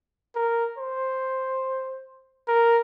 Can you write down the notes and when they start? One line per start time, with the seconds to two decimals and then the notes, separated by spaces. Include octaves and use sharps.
0.35 A#4
0.78 C5
2.48 A#4